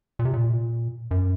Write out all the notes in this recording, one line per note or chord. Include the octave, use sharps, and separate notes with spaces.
A#2
C3
A#2
F#2